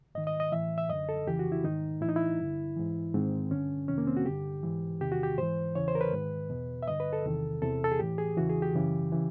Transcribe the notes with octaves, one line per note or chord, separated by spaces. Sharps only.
G#2 D#3 D#5
D#5
D#5
A2 E3 E5
E5
F#2 D3 D#5
A4
F2 C#3 E3 G4
F#4
E4
G#2 D#3 D#4
A2 E3 D#4 E4
E4
G2 D3
G#2 E3
G#2 D#3 C4
G2 D3 C#4
F2 C3 D#3 C#4
A#3
C4
F#4
G2 D3 G4
G#2 E3
E2 C3 D#3 G4
F#4
G4
G#2 E3 C5
E2 C#3 E3 C#5
C5
A#4
B4
G#2 D#3
E2 B2
E5
G2 D3 D#5
B4
A4
E2 C3 D#3
E2 C3 E3 A4
A4
G#4
A2 E3 G4
G#4
E2 C#3 E3 F#4
G#4
G4
F#2 C#3 E3
C#3 E3